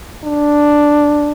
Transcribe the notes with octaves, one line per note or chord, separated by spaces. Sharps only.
D4